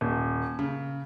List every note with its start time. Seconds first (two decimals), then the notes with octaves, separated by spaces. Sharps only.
0.01 D#1
0.59 C#3